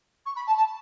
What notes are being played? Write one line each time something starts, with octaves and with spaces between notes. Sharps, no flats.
C#6
B5
A5
A5